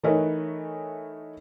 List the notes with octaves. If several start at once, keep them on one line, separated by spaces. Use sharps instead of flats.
E3 A3 D#4 A#4 B4 C#5